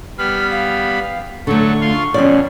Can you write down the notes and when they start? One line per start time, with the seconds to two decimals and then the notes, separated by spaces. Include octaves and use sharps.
0.18 G3 B3 B5 F6
0.51 F5
1.47 D3 F#3 A3 A4 C#6
1.81 F4 F5 C6
2.14 F2 B2 C#4 D5